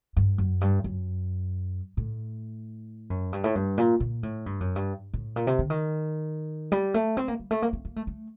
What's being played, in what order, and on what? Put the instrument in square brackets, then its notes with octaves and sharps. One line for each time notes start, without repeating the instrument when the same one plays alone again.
[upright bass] G2
F#2
G2
F#2
A2
F#2
G2
A2
G2
A#2
A#2
A2
G2
F#2
G2
A2
A#2
C3
D3
D#3
G3
A3
C4
A#3
G3
A3
A#3
C4
A#3
A3
A3